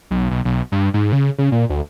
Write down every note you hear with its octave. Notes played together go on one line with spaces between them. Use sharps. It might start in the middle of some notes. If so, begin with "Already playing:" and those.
B1
B1
B1
G2
G#2
C#3
C#3
A#2
D2